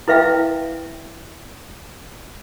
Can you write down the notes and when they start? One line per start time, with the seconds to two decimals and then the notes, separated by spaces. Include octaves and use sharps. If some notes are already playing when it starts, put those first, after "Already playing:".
0.08 E4 B4 E5 F5 G5